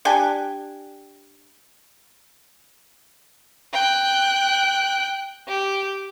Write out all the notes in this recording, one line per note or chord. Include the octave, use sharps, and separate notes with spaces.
D4 G4 G5 G#5
G5 F#6
G4